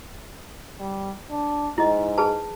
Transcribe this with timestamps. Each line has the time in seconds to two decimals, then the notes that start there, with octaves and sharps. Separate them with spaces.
0.80 G3
1.31 D4
1.78 G#2 E4 D#5
2.18 G#4 B4 A5